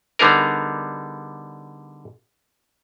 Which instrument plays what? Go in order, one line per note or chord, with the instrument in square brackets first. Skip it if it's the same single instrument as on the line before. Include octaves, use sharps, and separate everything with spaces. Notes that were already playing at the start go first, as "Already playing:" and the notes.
[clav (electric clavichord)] D3 G3 B3 D#4 G#4 A#4